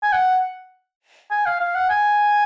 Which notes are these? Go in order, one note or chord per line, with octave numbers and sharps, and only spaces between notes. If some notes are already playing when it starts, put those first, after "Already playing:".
G#5
F#5
G#5
F5
F5
F#5
G#5